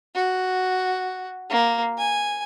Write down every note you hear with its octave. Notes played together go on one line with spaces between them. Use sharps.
F#4
A#3
G#5